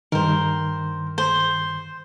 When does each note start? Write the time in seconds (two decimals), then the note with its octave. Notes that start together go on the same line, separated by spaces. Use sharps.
0.12 G2 D#3 A#4 C5
1.18 C5